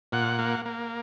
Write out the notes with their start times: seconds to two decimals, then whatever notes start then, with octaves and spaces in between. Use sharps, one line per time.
0.12 A#2 F#5
0.39 A#3
0.66 A#3